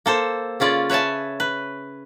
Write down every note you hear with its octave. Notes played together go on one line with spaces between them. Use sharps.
A#3 A4 C5
C#3 C#4 F4 D5
B4 C#5 E5 G#5 A5
B4